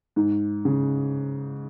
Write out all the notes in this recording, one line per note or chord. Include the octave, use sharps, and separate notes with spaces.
G#2
C#3